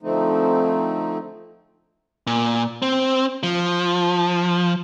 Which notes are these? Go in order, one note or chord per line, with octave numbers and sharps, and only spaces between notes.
D3 F3 A3 C4 D#4
A#2
C4
F3